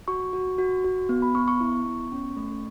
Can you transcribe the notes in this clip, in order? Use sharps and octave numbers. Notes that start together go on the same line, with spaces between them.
F#4 C#6
F#4
F#4
F#4
B3
B5
B3 C#6
C#6
E4
B3
C#4
A3